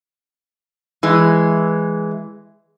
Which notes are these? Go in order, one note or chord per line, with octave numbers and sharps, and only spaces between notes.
E3 G#3